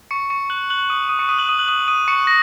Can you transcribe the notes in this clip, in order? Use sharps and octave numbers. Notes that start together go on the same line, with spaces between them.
C#6 C#7
C#6 C#7
F#6 F#7
F#6 F#7
D#6 D#7
D#6 D#7
C#6 C#7
D#6 D#7
F#6 F#7
D#6 D#7
F#6 F#7
D#6 D#7
D#6 D#7
C#6 C#7
A#6